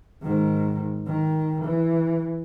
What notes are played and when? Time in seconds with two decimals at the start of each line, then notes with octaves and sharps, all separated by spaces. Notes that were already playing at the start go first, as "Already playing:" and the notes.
0.22 G#2 D#3
1.07 D#3
1.65 E3